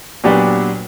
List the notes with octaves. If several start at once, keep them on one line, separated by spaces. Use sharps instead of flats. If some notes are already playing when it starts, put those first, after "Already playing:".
A#2 F#3 B3 D4 G4